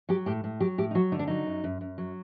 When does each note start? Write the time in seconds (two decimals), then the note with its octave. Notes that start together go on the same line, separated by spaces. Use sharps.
0.09 F#3 G4
0.26 A2 G4
0.44 A2
0.60 F#3 G4
0.78 A2 G4
0.91 D#4
0.95 F#3 F#4
1.12 D3 D#4
1.19 D4
1.28 F#3 D#4
1.47 F#2
1.64 F#2
1.81 F#2
1.98 F#3